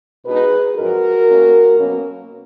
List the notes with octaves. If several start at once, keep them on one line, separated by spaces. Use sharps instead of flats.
B2 G#3 B3 D#4 G#4 B4
F#2 F3 G#3 F#4 A#4
D#3 A#3 C#4
B2 F#3 A#3 C#4